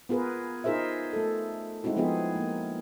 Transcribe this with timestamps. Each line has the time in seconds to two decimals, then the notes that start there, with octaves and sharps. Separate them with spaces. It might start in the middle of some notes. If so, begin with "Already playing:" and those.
0.09 B3 F4 G#4 A#4 B4
0.64 D#4 F4 G#4 A#4 C5 E5
1.13 A3 A4
1.84 G#3 C4 D#4 E4 F#4
1.96 F3 B3 D#4 F4 G#4
2.36 A#3